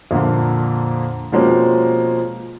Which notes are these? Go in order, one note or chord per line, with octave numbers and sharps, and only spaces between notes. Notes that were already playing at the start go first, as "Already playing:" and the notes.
F2 A#2 D3 A#3
B2 F3 G#3 A#3 C4 C#4